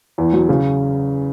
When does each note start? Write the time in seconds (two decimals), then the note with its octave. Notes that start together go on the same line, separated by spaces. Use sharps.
0.18 E2
0.33 F#3
0.49 C#3